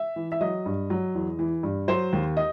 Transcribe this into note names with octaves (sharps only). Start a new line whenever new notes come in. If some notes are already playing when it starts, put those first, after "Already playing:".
Already playing: E5
E3
E5
F#3 D#5
G2
F#3
E2
E3
G2
F#3 C5
D#2
D#5